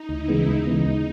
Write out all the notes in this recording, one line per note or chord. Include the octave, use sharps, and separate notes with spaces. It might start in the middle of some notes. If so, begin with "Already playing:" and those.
Already playing: D#4
D2 E4
C#3 E3 G#3 B3
D2 D#4
C#3 E3 G#3 B3
D2